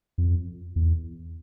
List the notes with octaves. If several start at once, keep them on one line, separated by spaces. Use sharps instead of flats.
F2
E2